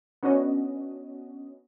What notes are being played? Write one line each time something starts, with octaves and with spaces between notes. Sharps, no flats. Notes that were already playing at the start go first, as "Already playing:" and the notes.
B3 C#4 D4 F#4 D#5